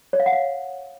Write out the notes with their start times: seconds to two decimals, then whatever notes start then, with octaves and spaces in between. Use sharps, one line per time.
0.13 C#5
0.20 F5
0.26 F#5
0.32 F5